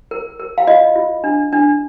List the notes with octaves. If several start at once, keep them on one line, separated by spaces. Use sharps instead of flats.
A#4
A#4
F5
F4 D#5
F4
D4
D4